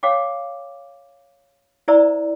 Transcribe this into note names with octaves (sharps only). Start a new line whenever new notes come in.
C#5 F5 G5 D6
E4 C5 D5 E5 A#5 E6